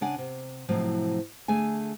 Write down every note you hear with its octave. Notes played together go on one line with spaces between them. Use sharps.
C#3 D4 F#5 G#5
C3
A2 C3 F3 F#3
D3 A3 G#4 G#5